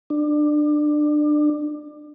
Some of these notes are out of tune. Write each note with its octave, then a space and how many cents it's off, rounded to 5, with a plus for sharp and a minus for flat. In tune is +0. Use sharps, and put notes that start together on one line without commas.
D4 +25